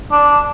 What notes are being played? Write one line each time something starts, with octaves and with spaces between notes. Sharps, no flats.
D4